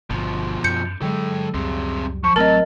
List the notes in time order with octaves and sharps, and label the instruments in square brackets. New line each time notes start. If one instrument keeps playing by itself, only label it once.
[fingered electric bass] G1 [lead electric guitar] B2 F3
[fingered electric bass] F#2 [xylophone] G6 C#7
[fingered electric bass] D3 F#3 G#3 [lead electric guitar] A4 G5
[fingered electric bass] C#2 F#2 G3 [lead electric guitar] C4 G#4
[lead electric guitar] F3 [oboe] C#6
[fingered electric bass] A1 A3 C4 [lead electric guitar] F#3 [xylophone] A#4 D#5 [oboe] A5